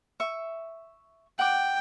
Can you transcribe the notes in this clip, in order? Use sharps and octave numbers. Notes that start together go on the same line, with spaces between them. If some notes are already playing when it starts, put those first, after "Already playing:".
E5 C#6
F#5 G5 D6